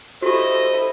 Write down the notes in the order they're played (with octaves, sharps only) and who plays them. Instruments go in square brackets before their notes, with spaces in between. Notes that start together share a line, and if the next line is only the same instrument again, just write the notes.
[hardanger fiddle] E4 D#5 [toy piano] F#4 G4 [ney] A4 [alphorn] C5